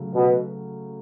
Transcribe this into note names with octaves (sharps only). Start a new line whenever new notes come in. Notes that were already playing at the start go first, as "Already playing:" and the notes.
Already playing: C#3 F#3 A3
B2